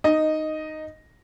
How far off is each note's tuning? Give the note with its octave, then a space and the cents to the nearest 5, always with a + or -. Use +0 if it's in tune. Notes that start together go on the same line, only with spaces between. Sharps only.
D#4 -10 D#5 +0